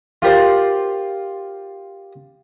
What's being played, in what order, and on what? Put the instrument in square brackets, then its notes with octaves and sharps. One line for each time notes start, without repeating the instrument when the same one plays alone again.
[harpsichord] F4 G4 A#4 C5 D5